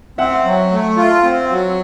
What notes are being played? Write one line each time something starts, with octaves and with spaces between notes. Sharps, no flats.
C4 E5 F#5
F#3
A3
F4
C4
F#3